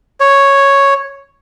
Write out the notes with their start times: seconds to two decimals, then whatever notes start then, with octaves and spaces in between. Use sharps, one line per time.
0.20 C#5